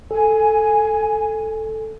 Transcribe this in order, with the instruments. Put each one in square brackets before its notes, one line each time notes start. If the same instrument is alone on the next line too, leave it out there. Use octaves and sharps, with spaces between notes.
[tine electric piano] A4 [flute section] G#5